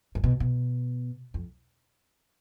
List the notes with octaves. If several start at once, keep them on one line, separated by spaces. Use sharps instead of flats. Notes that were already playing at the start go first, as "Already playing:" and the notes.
G2
B2
B2
F2